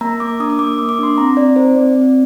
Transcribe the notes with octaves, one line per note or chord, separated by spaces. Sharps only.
A#3 A#5
A#3 D6
D4 D#6
D#6
A#3 D6
A#3 D#6
D6
D4 C6
C4 A#5
C4 D5
D#4 C5
C4 D5
C4